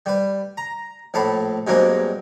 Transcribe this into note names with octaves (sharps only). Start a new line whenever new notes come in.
G3 B4
A#5
A#1 A2 F5 A5 B5
G2 B2 F#3 G#3 A#3 C4